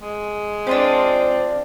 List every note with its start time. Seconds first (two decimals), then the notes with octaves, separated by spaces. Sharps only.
0.02 G#3
0.67 C4 D4 F4 G4 D5